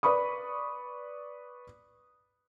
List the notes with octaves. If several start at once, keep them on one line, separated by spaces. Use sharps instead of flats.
B4 D5 B5 C#6 D#6